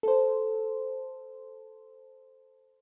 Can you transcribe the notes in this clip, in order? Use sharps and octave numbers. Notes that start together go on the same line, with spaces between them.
A4 C5